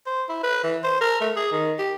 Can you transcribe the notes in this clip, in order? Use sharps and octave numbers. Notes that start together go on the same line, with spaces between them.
C5
E4
B4
E3
C5
A#4
A3
G#4
D#3
G4